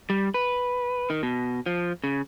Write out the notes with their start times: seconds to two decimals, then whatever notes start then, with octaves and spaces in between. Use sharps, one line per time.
0.10 G3
0.34 B4
1.10 D#3
1.23 B2
1.66 F3
2.04 C#3